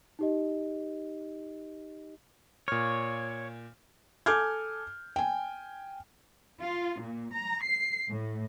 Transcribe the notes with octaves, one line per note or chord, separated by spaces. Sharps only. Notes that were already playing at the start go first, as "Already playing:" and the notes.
D#4 G4 D#5
A#2 C#5 F6
A4 G#5 D6 F6 G6 G#6
G5 G#5
F4
A#2
A#5
C7
A2